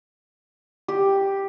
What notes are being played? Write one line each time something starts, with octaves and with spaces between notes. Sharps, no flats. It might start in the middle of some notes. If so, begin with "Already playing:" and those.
G4